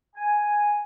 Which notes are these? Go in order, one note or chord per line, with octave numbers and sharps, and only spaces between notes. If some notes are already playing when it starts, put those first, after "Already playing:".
G#5